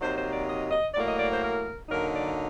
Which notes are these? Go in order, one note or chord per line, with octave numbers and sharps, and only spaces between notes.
C3 F#3 A#3 D#4 C5
C5
D5
D#5
D#5
A2 F#3 A#3 D5
D#5
D5
C5
A#4
D3 F#3 A#3 D#4 A#4
D5